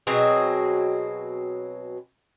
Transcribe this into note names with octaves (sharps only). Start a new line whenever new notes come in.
B2 F#3 C4 G#4